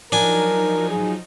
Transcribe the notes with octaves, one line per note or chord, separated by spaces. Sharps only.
F3 F#3 D4 D#4 A#4 G#5
G#4